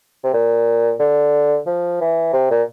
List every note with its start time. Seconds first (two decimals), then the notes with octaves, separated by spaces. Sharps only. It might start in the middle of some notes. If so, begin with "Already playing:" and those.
0.24 C3
0.33 A#2
0.99 D3
1.67 F3
2.01 E3
2.33 C3
2.50 A#2